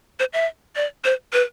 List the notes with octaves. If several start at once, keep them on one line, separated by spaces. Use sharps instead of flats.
C5
E5
D5
C5
B4